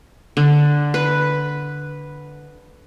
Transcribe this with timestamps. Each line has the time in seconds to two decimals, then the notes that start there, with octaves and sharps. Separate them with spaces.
0.37 D3
0.94 B4